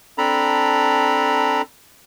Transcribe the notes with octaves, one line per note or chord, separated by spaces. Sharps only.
C4 D4 A4 A#5 B5